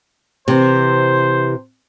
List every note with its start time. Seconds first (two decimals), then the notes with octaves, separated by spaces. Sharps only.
0.48 C3 E3 C5